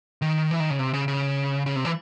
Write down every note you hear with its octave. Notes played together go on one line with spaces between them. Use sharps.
D#3
E3
D#3
C#3
C3
C#3
C#3
C#3
C3
E3